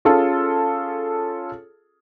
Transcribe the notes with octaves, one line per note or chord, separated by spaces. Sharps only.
C#4 F4 G#4 A4